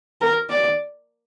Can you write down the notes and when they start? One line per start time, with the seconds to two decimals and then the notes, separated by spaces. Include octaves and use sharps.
0.21 A#4
0.49 D5